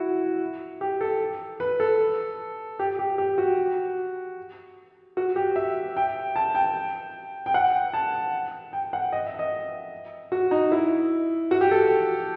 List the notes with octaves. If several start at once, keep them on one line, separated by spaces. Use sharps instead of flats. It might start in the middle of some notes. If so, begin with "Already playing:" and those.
Already playing: E4 F#4
G4
A4
B4
A4
G4
G4
G4
F#4
F#4
G4
E5
G5
A5
G5
G5
F#5
A5
G5
F#5
D#5
E5
D#5
F#4
D#4
E4
F#4
G4
A4